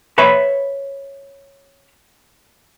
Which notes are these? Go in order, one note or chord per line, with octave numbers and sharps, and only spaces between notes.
B4 C#5 E5 B5